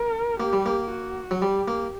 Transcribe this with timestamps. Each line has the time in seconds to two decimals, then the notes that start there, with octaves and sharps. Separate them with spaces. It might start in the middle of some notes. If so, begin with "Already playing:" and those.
Already playing: A#4
0.40 A#3 G4
0.53 G3
0.66 A#3
0.90 F#4
1.31 F#3
1.42 G3 G4
1.68 A#3